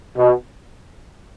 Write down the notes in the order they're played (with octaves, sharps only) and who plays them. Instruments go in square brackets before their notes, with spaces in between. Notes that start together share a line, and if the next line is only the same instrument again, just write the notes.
[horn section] B2